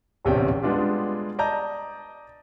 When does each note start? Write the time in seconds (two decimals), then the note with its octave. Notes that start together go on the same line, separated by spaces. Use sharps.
0.25 D1 A#1 E2 C3 C#4 G5
0.63 G3 G#3 B3 D4 F4 G4
1.39 D5 D#5 A5 A#5 G6